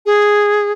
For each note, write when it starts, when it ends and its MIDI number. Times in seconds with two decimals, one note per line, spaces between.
0.06 0.72 68